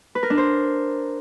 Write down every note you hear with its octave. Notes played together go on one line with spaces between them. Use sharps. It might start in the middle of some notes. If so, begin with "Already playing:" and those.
B4
A#4
D4
C5